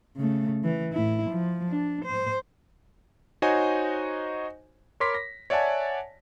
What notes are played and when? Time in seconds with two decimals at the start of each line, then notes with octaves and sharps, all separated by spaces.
0.17 C#3 A3
0.64 E3
0.93 A2 E4
1.30 F3
1.70 D4
2.05 C5
3.42 D#4 F#4 C5 C#5 D#5 G#5
5.00 A#4 C#5 B5 C6 D6 B6
5.14 A#6
5.50 C#5 D5 E5 F#5 G#5 A5